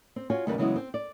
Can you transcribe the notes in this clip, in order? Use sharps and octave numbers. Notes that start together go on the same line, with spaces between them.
C4
F4 F#4 C#5 G#5
D#2 C#3 G3 A#3 D#4 B4
C#3 E3 F#3 G#3 B3 E4
C4
D5